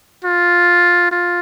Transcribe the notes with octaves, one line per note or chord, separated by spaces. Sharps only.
F4
F4